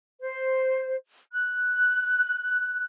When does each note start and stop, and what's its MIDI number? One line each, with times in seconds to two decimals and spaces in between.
0.20 0.95 72
1.32 2.84 90